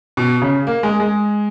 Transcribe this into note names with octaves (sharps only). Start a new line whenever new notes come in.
B2
C#3
A#3
G#3
G#3